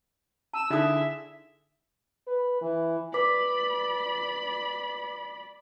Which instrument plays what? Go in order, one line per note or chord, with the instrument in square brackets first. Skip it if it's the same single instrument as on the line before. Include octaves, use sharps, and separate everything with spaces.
[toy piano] A5 [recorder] E6
[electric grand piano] D3 E4 G#4 [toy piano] D#4 D#6 [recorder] E5
[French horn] B4
E3
[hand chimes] B4 D6 B6 [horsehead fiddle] D5 B5